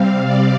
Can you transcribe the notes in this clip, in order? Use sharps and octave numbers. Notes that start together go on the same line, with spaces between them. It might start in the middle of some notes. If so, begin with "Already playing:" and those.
Already playing: C3 G3 C4 F5
D5